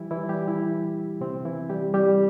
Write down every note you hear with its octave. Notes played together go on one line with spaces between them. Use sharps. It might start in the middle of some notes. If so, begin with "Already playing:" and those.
Already playing: E3 G3 E4 G4
E3 E4
G3 G4
E3 E4
C3 C4
E3 E4
G3 G4
G3 G4